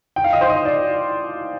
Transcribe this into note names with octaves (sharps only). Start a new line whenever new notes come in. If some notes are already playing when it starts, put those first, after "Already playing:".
G5
F5
D#5
C5
D#5
D5